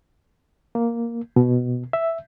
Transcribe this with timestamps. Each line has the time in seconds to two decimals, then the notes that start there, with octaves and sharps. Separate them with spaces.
0.75 A#3
1.36 B2
1.93 E5